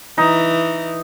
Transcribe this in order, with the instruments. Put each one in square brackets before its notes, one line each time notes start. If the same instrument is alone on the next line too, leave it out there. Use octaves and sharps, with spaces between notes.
[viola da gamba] E3 [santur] D#4